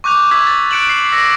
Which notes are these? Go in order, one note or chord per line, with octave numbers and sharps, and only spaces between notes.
C#6 D6 F#6 G6 F7
C#6 E6 G#6 B6
A6
F#6 C#7 D7 E7 F#7
C7
E6 A#6 C#7